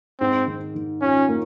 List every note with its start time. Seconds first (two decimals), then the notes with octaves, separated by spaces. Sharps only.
0.20 G#2 C4
0.47 D#3
0.75 D#3
1.01 C#4 F4
1.28 A#3